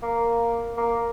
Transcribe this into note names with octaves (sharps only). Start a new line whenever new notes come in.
A#3
A#3